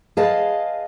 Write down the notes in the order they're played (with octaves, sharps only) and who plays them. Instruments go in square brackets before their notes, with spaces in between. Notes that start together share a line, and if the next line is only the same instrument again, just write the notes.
[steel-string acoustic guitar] G#4 B4 D#5 F5 A5